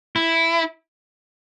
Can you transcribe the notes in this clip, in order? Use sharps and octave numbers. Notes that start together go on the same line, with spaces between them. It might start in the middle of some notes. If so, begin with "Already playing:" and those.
E4